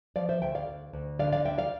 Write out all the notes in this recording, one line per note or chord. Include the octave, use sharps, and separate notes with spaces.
F3 D5 F5
C5 E5
D2 E5 G5
D5 F5
D2
D2
D3 D5 F5
D5 F5
D2 E5 G5
D5 F5